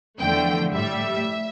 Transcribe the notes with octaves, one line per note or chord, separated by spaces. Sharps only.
E2 D3 F3 A3 G5
A2 G3 E5